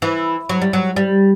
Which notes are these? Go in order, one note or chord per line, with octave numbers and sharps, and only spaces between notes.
E3
F#3
G3
F#3
G3